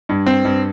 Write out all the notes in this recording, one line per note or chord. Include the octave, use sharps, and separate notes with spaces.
G2
C4
G2